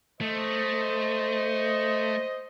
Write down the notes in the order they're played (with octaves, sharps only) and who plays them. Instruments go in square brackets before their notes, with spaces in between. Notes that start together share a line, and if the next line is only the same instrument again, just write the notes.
[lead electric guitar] A3 [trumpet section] C5 D#5